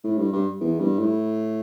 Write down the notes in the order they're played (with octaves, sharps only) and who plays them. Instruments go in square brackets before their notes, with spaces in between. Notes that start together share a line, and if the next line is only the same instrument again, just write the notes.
[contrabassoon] A2
G2
G2
E2
G2
A2